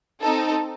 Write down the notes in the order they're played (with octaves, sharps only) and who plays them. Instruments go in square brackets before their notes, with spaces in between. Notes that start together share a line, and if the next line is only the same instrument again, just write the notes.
[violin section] C4 D#4 A4